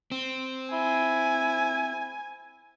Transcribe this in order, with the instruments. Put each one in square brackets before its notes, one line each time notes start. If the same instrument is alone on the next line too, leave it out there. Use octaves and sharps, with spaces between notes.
[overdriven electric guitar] C4
[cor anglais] E4 [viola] G#5